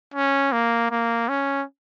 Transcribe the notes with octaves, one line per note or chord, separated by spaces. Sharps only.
C#4
A#3
A#3
C#4